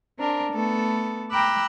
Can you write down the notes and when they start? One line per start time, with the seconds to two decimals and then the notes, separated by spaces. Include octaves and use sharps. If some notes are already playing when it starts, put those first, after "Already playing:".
0.18 C4 D4 A#4
0.52 A3 B3 A4
1.31 G5 A#5 B5 D6 E6 F#6